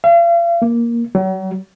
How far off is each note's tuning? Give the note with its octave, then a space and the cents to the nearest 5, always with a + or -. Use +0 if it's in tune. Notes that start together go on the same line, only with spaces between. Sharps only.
F5 -40
A#3 +10
F#3 +40